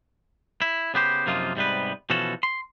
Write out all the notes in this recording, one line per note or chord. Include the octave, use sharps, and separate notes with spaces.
E4
C#3 B3 G4 C5
F#2 C3 F3 A#3 D#4 F4
G#2 C3 G3 B3 B4
B2 E3 F3 C#4 F#4 A4
C6